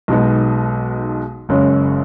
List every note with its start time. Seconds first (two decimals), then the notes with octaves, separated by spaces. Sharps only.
0.08 B1 B2 G#3 B3 D#4
1.49 F#1 F#2 C#3 G#3 C#4